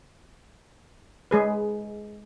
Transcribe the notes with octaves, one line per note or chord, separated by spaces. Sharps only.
G#3 G#4 B4